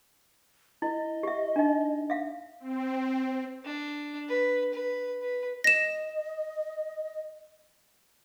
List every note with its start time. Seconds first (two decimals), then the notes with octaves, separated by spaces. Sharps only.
0.82 E4 D#5
1.23 G4 E5
1.56 D4 D#4
2.10 E5 F5
2.60 C4
3.65 D4
4.29 B4
4.74 B4
5.22 B4
5.64 D#5 A#6 E7